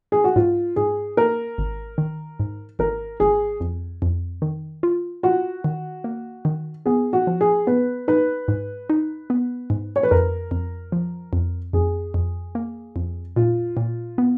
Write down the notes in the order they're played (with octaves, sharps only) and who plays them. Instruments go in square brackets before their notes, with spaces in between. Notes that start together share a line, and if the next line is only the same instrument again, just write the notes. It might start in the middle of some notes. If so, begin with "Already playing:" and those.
[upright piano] G#4
F#4
[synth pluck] G#2 [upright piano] F4
[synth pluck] G#2 [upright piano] G#4
[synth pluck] A#3 [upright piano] A#4
[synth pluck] G#1
D#3
G#2
[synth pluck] G#1 [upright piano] A#4
[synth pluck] G#1 [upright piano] G#4
[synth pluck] F2
F2
D#3
F4
[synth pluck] F4 [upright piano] F#4
[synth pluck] D#3
A#3
D#3
[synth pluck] B3 [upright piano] G#4
[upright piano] F#4
[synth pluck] F3
[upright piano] G#4
[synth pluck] B3 [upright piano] B4
[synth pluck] D#4 [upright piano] B4
[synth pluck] G#2
D#4
B3
G#2
[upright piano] C#5
B4
[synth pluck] F2 [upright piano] A#4
[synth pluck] F2
F3
F2
[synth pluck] F2 [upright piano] G#4
[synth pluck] F2
A#3
F2
[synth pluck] A#2 [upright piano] F4
[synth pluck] A#2
B3